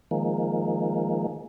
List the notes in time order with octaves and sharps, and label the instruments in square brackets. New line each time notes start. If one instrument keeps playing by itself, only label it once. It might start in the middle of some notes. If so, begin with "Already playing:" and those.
[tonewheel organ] D#3 F3 G#3 A#3